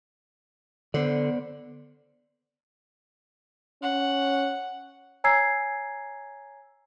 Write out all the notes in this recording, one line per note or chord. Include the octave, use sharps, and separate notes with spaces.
D3 B3 C5 D5
C#4 F#5
C#5 G#5 A#5 E6 G#6 C7